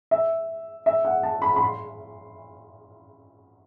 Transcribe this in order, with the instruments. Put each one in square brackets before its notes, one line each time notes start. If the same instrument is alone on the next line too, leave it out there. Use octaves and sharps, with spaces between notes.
[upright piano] E5
E5
F#5
A5
B5
B5
C6